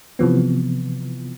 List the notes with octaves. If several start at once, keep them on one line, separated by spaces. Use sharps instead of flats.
C3 E3 F3 B3